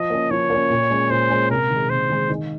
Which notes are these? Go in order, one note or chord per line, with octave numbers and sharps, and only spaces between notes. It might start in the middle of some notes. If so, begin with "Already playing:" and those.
Already playing: F3 D#5
A#3 C#4
F3 C#5
A#3 C#4
A#2
G#3 C#4
A#2 C5
G#3 C#4
C3 A#4
D#3 G#3
C3 C5
D#3 G#3
D#3